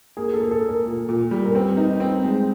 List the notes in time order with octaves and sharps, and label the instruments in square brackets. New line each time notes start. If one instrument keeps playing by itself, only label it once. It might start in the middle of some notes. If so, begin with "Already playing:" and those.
[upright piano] A#3 [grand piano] G#4
[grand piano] A4
[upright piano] A#3
[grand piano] A4
[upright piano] A#3
[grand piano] A#4
[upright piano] A#2
A#2
G3
[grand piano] A#4
[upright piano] C4 [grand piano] B4
[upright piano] D#4
C4
G#3